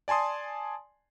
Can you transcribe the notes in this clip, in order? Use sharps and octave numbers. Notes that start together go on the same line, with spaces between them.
D5 G#5 A5 C6 D#6